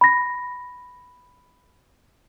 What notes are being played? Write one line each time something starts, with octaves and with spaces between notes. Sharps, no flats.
B5 A#6